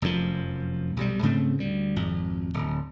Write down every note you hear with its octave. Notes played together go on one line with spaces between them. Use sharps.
F1 F#2 B2 F3
B1 C3 G3
G#2 C#3 A3 C4
D2 G3
G#1 F2
D1